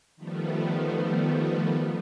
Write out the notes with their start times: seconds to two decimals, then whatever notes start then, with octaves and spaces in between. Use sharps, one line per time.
0.16 D#3 F3 G3 A3 B3